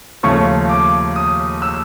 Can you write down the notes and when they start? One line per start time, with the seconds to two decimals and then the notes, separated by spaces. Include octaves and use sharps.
0.23 D#2 C#3 F3 A3 C#4 C#6
0.69 D6
1.16 D#6
1.62 E6